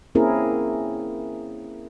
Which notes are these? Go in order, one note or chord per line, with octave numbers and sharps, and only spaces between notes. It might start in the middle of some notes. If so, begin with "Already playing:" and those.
A#3 C4 C#4 E4 G#4 A#4